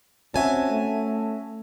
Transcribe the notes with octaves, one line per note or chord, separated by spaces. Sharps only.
C4 C#4 F#4 E5 G#5 A5
A3